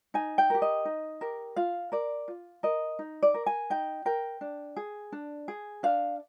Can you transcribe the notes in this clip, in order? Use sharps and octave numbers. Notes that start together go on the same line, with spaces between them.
D#4 G#5
G5
G4 A#4
D#5
D#4
G4 A#4
F4 F5
A#4 D5
F4
A#4 D#5
D#4
D5
A#4
G#5
D#4 G5
A#4 G5
D4
G#4
D4
G#4
D4 F5